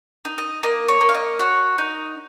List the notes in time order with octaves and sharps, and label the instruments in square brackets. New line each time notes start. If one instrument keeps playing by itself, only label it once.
[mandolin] D#4
D#5
A#3 D#5
C#5
A#3
F5
D#5
F#4 C#5
D#4